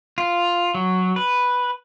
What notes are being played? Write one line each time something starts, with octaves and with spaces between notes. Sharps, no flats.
F4
F#3
B4